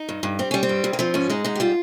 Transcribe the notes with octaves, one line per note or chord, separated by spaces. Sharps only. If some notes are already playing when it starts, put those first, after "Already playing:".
Already playing: D#4
G2
G2
G3 C4
G3 C#4
C4
G2
G2
A#3
F3 C4
G#2 C#4
G#3 D#4
G#2 D#4
G4
G3 F4